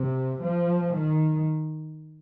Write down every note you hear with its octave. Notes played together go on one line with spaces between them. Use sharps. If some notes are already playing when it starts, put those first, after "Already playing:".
Already playing: C3
F3
D#3